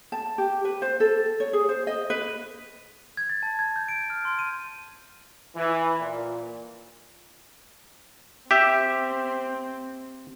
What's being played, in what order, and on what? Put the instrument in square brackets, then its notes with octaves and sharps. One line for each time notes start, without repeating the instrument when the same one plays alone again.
[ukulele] A5
G4
B4
C5
A4
C#5
G#4
C5
D#5
B4
[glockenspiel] G#6
A6
A5
G#6
G6
D7
F6
C6
D#7
[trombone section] E3
A#2
[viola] C4 [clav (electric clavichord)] G4 E5